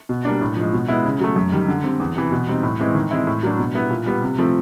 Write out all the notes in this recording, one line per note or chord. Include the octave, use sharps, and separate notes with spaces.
B2
G3 A#3 D4
A2
F3 G#3
B2
G#3 B3 E4
C#3
F#3 A3
F#2
D#3 G3
D3
G3 C4
E2
C3 E3
B2
G3 C4 D#4
A2
E3 G#3 C4 E4
D#3
G#3 C4 E4
A2
F#3 A#3 D4
B2
G3 B3 E4
A#2
G3 B3
C3
F3 A3 C4